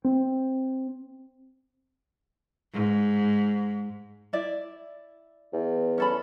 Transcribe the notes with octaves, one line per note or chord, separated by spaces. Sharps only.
C4
G#2
E4 D5 E5
E2
C#4 A4 B5